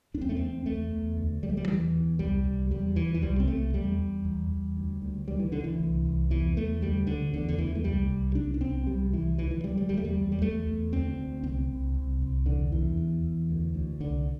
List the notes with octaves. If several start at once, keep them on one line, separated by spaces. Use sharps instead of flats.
E2 D4
C4
A3
E2 C4
E2 A3
E2
D2
D2 G3
A3
G3
E2 E3
E2
C2 G3
C2
E2 G3
E2 E3
E3
C2 G3
C4
C2 A3
E2 G3
E2
E2
E2
D2
D2
D2 G3
E3
D2 D3
E3
C2
C2
E2 E3
E2 A3
D2 G3
D2 D3
E2 D3
D3
E2 E3
A3
C2 G3
C2
C2 D4
D4
C2 C4
C2 G3
C2 E3
D2 E3
E3
D2 G3
G3
E2 G3
A3
G3
E2
G3
E2 A3
E2
D2 C4
D2
C2 C4
C2
C2
C2
E2 D3
E2 E3
E2
E2
D2
D2
C2 D3